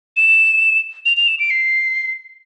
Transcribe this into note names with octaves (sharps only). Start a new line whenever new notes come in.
E7
F7
F7
E7
D7
C7